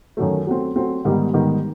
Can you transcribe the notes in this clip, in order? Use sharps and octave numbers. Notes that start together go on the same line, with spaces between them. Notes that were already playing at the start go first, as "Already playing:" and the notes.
F#2 D#3 F#3 A3
F#3 A3 C4
F#3 A3 C4
G#2 D#3 G3 B3 D#4
G#2 D#3 G3 B3 D#4